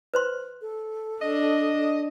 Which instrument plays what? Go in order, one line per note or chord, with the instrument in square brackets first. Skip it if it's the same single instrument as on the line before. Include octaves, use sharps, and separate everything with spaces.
[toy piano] B4 C5 C6
[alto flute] A4
[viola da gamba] D4 [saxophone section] D#5